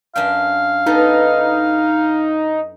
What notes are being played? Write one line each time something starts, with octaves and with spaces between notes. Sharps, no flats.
F#2 D4 F5 G5
B3 D#4 A4